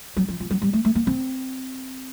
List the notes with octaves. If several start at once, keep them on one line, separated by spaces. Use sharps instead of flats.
F#3
F3
F3
F#3
G3
A3
A3
A#3
C4